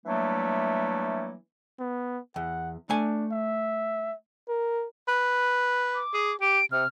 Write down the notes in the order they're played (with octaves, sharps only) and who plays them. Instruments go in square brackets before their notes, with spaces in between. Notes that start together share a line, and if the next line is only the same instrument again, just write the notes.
[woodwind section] E3 F#3 G3 A3 A#3 D4
[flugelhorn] B3
[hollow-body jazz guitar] E2 [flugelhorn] F#5
[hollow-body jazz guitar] A3 G#5 [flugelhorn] D4
[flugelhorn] E5
A#4
[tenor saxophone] B4
[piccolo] D6
[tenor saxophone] G#4
[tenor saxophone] G4 [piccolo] D7
[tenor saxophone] C3 [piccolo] F6